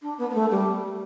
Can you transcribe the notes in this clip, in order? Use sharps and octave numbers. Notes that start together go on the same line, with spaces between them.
D4
B3
B3
A3
G3